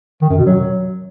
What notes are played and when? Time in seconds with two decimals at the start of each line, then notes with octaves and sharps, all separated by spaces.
0.22 D#3
0.30 F#2
0.38 B2
0.46 F#3